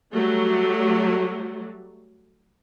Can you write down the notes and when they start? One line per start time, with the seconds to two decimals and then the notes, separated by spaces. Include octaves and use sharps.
0.14 F#3 G3 A3